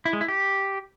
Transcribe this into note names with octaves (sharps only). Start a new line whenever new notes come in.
E4
G#3
E4
G4